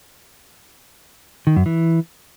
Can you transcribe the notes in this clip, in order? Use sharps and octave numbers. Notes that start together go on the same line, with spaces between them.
D#3
F#2
E3